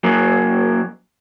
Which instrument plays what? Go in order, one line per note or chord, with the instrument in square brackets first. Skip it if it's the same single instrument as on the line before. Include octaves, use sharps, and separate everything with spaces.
[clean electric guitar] F#2 F#3 A#3